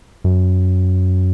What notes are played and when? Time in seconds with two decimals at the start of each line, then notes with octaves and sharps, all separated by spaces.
0.24 F#2